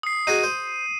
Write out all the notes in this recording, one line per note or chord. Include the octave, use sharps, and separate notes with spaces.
D#6 C7
D#4 F#4 G#4 D#7
C5